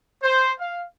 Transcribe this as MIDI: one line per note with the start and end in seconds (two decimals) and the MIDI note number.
0.23 0.50 72
0.59 0.83 77